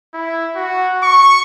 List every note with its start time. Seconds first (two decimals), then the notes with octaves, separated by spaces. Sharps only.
0.14 E4
0.56 F#4
1.03 C#6